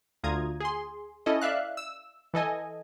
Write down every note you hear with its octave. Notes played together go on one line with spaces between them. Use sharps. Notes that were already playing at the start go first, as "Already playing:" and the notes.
D2 F4 A#5 D#6 G#6
G#4 C6
C#4 E4 A4 D#5
D5 E5 F5 F#6
E6
E3 A4 D#5 G#5